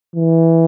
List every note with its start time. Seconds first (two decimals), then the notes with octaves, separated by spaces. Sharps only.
0.16 E3